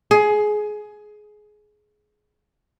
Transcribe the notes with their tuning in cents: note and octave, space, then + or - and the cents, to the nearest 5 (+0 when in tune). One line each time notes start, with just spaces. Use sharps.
G#4 +20